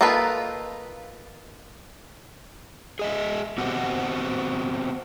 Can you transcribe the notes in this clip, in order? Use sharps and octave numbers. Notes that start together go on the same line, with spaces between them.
A#3 D#4 F4 A4 B4
G#4 D#5 E5
B3 C4 F#4 G4